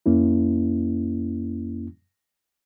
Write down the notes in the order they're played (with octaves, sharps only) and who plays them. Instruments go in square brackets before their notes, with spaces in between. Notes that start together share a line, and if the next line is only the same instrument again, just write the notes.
[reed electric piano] F2 A#3 C#4 E4